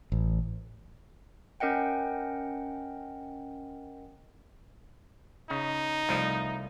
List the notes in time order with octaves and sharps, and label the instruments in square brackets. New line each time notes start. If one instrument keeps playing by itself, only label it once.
[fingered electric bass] A1
[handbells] C#4 A#4 D#5 F#5 G5
[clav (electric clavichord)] C#3 [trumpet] D#4
[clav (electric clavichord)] C2 F3 A3